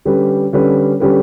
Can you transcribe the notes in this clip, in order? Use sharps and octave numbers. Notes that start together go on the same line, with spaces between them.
D3 G3 C#4 G4 B4
D3 G3 C#4 G4 B4
D3 G3 C#4 G4 B4